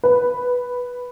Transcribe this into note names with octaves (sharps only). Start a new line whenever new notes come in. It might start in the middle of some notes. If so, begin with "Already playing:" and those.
B4